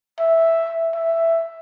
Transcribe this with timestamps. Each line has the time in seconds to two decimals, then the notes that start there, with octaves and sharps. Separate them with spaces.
0.19 E5
0.94 E5